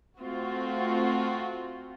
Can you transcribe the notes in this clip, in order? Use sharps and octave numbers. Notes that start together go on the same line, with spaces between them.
A3 C4 F4 F#4